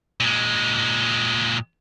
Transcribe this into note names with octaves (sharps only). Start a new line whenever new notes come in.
A#2 G#3